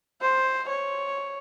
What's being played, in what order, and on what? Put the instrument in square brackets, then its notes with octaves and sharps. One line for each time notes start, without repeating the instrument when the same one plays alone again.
[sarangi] C5
C#5